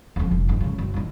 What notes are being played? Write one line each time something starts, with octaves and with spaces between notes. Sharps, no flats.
D#1 F2
F1
G#2 D#3
A2 C#3
F#1
A1 D#3